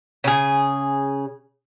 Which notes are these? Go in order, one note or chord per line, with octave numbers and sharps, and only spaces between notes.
C#3 G#4